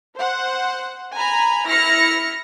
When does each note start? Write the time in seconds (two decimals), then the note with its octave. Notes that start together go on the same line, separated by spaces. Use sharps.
0.17 C5 F#5
1.16 G#5 A#5 B5
1.68 E4 F6 A#6 C#7